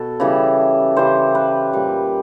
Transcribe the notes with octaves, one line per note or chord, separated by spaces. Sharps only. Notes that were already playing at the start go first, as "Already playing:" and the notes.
Already playing: B2 A4
C#3 E3 G3
C#3 E3 G3 C5
B4
A#2 G3